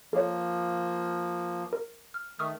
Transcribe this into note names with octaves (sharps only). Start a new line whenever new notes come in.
F3 A#3 A4 C#5
A#4
F6
D#3 A3 C#6 D#6 F6